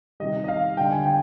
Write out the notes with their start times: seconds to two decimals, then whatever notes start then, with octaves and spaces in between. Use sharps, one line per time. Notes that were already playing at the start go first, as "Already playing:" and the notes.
0.20 C3 D#3 G3 D#5
0.44 D#5
0.48 F5
0.77 D3 G3 G5
0.91 G#5
1.06 G5